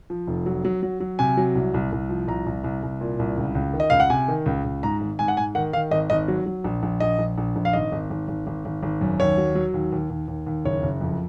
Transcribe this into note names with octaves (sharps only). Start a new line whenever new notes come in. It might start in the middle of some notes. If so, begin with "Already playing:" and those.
F3
F1
F#3
F#3
F#3
F#3
C3 G#5
F#3
C2
C2
C2
F3
C2 A#5
C2
C2
C2
A#2
C2
C#2
C#2
D#3
D#5
C#2 F5
F#5
C3 G#5
D#3
C#2
C#2
G#2 A#5
G#1
G#2 G#5
F#5
G#2 G#5
D#3 F#5
D#3 F5
G#1 D#5
G#1 D#5
F#3
F#3
A#1
A#1
A#1 D#5
A#1
A#1
A#1
F5
G#1 D#5
G#1
G#1
G#1
G#1
G#1
G#1
F#2
D#2 C#5
F#3
F#3
D#2
D#2
D#2
D#2
D#2
F#1 C#5
F#1
F2